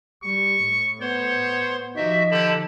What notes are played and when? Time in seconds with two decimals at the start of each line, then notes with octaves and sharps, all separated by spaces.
0.23 G3 C#6
0.64 A2
1.01 B3 C5 C#5 C6
1.96 F3 D#4 F#4 G4 E5
2.31 D3 G4 A5 B5